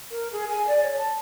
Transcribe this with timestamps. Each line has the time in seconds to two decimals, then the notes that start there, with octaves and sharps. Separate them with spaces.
0.11 A#4
0.32 G#4
0.50 G#5
0.67 D5
0.83 C#5
0.97 A5